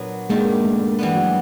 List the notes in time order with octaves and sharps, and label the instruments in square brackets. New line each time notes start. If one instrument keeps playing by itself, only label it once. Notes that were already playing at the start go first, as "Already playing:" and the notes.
Already playing: [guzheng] A#2 F#3 B3 D4
[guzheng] G2 D#3 G3 [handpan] G#3 A#3
[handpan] A3
[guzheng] E3 G3 B3
[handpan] F#3